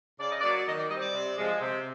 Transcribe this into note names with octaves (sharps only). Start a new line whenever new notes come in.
C#3 D5
D#5
D5
F#3 A#3
D#3 D#5
D5
G3 C4 D#5
D5
C3
F3 G#3
C3